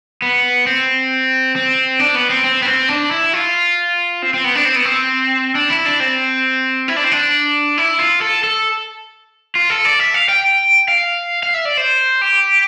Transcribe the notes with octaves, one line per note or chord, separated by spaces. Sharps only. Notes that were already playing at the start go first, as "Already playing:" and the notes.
B3
C4
C4
D4
B3
C4
C4
B3
C4
D4
E4
F4
C4
C4
B3
D4
C4
B3
C4
D4
E4
D4
C4
E4
D4
C4
D4
E4
F4
A4
A4
F4
A4
D5
E5
F5
G5
F5
F5
E5
D5
C5
G4